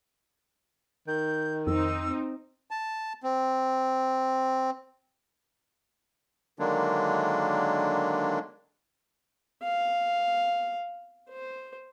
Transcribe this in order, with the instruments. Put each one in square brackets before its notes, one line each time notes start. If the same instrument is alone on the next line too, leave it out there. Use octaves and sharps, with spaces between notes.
[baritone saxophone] D#3 [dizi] G6
[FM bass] F2 [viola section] C4 D#4 [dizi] E6
[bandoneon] A5
C4
D3 D#3 F#3 G#3 A#3 D4
[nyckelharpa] F5
C5